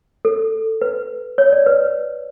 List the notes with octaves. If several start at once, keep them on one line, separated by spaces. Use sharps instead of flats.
A4
B4
C#5
D5
B4